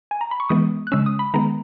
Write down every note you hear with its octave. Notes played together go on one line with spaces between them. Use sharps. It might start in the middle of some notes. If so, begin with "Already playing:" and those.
G#5
A#5
B5
C#6
E3 G#3 B3 D#6
F#6
C#3 G#3 C#4 E6
D#6
B5
D#3 G#3 B3 A#5